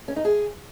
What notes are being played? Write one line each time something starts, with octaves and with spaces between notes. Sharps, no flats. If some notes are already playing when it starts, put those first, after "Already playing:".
C#4
D#4
G#4